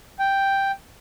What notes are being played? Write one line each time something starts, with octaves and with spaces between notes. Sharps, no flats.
G5